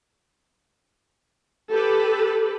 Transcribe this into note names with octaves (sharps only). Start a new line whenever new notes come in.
G4 A4 B4